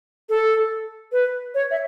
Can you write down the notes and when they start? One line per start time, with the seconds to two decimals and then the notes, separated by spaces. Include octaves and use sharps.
0.29 A4
1.12 B4
1.55 C#5
1.71 E5